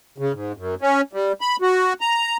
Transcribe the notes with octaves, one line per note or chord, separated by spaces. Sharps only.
C#3
G#2
F#2
C#4
G3
B5
F#4
A#5